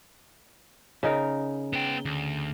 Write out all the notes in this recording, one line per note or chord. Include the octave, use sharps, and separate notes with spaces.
C#3 D#4 A#4
B3 G5
D2